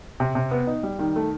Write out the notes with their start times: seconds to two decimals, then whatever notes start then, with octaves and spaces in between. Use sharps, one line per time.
0.20 C3
0.35 C3
0.51 B3
0.67 D#4
0.83 G3
0.99 D#3
1.16 A3